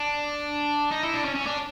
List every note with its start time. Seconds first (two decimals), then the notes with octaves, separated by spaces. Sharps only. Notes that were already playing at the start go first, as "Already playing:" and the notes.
Already playing: D4
0.91 D#4
1.03 E4
1.13 D4
1.25 C#4
1.35 C#4
1.47 D4